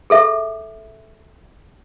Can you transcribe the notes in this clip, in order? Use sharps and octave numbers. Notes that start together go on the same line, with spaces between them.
G#4 A4 E5